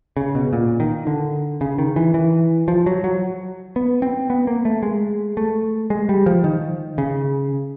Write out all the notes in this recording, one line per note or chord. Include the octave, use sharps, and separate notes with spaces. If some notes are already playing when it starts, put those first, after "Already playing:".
C#3
B2
A#2
D#3
D3
C#3
D#3
E3
E3
F3
F#3
F#3
B3
C4
B3
A#3
A3
G#3
A3
G#3
G3
F3
D#3
C#3